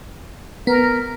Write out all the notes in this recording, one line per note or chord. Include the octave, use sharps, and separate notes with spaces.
B3 A#4